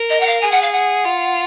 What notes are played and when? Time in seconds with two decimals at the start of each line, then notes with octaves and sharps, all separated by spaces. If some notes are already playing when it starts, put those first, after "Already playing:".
Already playing: A#4
0.09 D#5
0.20 F#5
0.26 F5
0.41 G#4 G#5
0.51 F#5
0.62 F5
0.72 F#5
1.05 F4